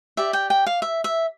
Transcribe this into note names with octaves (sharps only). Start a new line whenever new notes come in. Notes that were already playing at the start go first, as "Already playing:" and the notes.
G4 D5 E5
G5
G5
F5
E5
E5